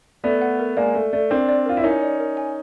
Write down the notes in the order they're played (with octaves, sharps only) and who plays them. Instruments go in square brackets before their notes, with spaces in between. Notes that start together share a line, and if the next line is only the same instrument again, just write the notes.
[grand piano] A3 B3 [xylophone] D5
[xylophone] F#5
A#4
[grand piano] G#3 A#3 [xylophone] D5
[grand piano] A3 [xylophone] D5
[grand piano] A3 [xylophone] D5
[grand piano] C4 D4 [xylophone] A#4
[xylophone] D5
[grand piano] F4 [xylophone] A#4
[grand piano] E4
[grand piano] C#4 D#4 [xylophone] A#4
[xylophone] D5
A#4
G#5